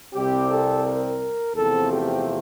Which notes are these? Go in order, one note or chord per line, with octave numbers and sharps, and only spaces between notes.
C2 C3 G3 C4 G4
A4
A#4
E2 C3 F3 A3 C4 A4
G4